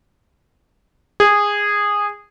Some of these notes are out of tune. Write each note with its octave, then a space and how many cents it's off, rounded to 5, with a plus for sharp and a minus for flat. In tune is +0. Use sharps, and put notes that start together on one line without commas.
G#4 -15